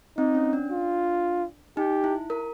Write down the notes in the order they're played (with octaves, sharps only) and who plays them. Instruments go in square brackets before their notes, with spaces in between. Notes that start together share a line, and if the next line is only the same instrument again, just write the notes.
[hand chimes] C4 [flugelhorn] D#4
[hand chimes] C#4
D4
[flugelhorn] F4
[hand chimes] D#4 [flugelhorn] G4
[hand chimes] E4
A#4